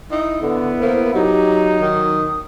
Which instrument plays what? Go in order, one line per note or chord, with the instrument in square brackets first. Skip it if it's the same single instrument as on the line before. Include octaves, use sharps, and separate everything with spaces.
[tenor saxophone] D#4 [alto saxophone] E4
[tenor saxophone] D3 [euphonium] B3 [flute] A4
[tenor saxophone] A#3 [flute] C5
[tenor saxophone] F#3 [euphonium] D#4 [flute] G4
[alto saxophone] D#3 [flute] D#6